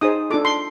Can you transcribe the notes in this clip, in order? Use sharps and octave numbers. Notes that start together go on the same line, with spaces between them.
D#4 G#4 C5 D#6
D4 F4 A4 D6
C6